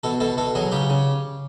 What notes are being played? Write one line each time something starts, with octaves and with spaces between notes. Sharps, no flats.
B2 A4
B2 A4
B2 A4
F#3 G#4
C#3 G4
C#3